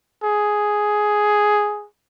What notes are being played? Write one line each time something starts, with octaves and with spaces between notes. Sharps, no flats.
G#4